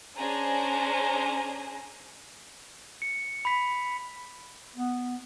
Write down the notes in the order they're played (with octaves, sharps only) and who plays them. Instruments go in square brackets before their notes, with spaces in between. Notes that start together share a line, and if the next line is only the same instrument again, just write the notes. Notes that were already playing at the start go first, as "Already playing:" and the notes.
[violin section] C#4 D4 G#4 C5 A#5
[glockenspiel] C#7
B5 B6
[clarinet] B3